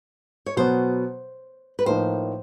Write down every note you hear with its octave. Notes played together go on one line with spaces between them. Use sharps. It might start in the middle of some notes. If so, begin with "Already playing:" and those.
C#5
B2 F#3 B3 C5
B4
A2 F3 A#3 D#4 C5